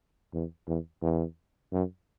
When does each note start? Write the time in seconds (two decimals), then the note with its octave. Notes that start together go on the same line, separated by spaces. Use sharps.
0.33 E2
0.67 E2
1.02 E2
1.72 F#2